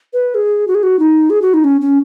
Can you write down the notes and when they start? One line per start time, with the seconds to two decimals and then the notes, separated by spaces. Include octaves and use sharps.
0.13 B4
0.35 G#4
0.68 F#4
0.75 G#4
0.83 F#4
0.99 D#4
1.30 G#4
1.42 F#4
1.54 D#4
1.64 C#4
1.81 C#4